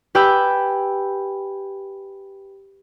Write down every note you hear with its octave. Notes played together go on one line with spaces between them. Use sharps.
G4 B4 G5 G#5 B5 E6